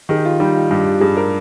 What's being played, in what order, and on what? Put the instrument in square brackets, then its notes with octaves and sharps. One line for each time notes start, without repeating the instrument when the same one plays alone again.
[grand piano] D#3 [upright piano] G#4
[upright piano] G4
F4
[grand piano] G3 [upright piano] D#4
[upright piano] F4
[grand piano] G2 [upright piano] G4
[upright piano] G4
[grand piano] G2 [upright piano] G#4
[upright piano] A#4